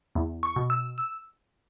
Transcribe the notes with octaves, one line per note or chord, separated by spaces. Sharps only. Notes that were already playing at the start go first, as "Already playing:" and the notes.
E2
C#6
B2
E6
E6